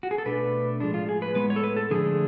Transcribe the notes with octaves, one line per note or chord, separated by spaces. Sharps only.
F#4
G#4
A4
B2 A3 D4 B4
A2 F3 G#3 D4
F4
G#4
B4
A2 G#3 B3 B4
C#5
A4
B4
A4
D3 F3 A3 D4 G#4